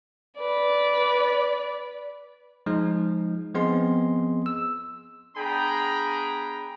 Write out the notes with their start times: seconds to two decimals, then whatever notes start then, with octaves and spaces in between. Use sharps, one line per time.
0.39 B4 D5
2.66 F3 G#3 D#4
3.55 F3 B3 C4 G#4 D#5 C6
4.46 E6
5.36 B3 D4 G#4 G5 A#5 B5